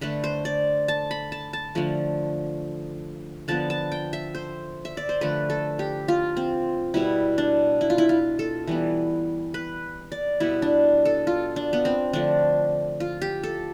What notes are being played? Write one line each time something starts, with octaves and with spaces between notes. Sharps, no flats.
D3 A3 B4
C5
D5
A5
B5
A5
A5
D3 F3 A3
D3 F3 B3 A5
A5
G5
E5
C5
E5
D5
C5
D3 F3 A3 B4
A4
G4
F4
C4
B2 G3 B3 E4
D4
E4
F4
E4
F4
A4
E3 G3 B3
B4
D5
B2 G3 B3 E4
D4
A4
F4
D4
B3
C4
D3 F3 A3 D4
F4
G4
A4